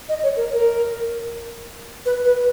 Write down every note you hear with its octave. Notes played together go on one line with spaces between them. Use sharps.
D#5
C#5
A#4
A#4
B4
B4